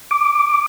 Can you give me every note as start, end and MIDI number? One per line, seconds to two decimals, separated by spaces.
0.11 0.66 86